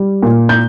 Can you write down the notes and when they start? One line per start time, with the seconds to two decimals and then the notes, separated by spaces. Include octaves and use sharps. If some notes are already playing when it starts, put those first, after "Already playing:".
Already playing: G3
0.23 A#2
0.49 G6